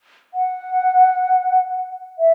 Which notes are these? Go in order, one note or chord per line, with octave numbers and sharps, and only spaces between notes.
F#5
E5